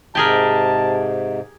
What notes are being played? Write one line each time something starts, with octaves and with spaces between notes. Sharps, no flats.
G#2 C3 G4 G#4 A#4 A5